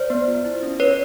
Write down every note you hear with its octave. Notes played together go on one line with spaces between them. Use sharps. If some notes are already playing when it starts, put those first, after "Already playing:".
Already playing: C5 D5
B3
F4
E4
C#4
C#4 B4 C#5